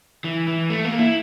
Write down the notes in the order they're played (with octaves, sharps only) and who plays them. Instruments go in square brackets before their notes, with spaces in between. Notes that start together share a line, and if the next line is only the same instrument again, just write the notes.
[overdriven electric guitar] E3
E3
A3
A#3
E4